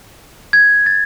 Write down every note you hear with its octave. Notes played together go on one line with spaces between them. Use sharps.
G#6
A6